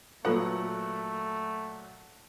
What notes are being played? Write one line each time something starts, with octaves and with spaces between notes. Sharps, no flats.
A#2 F#3 A3 F4 A4 B4 F#5